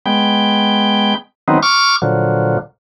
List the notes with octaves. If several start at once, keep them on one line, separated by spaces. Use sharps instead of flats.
G#3 B3 G5
D#3 F#3 B3 C4 D#4
C#6 D6 F6
A#2 D3 F3 F#3